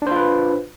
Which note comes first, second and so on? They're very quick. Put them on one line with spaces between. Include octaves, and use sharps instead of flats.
D4 C5 F4 B4